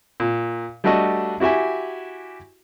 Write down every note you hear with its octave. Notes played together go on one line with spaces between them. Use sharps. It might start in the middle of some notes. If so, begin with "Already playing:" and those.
A#2
G3 A3 D4 F#4 A4 D#5
E4 F#4 G4 E5 G#5